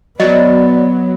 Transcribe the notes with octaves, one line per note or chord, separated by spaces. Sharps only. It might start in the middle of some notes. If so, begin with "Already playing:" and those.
F#3 B3 D5 D#5